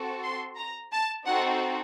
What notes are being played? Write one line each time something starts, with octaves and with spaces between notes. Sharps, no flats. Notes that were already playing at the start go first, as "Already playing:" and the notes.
Already playing: C4 F#4 A4
C6
A#5
A5
C4 D#4 F#4 A4 F#5